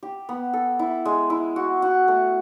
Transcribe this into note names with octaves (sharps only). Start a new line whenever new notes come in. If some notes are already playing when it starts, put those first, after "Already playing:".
G4
B3
A4
E4
G#3
E4
F#4
F#4
A3